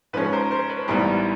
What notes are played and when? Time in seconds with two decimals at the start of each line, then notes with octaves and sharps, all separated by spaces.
0.13 G#2 F3 G#3 C#4 B4
0.33 A#4 C5
0.50 A#4 C5
0.69 B4
0.88 A1 G#2 E3 G3 B3 A#4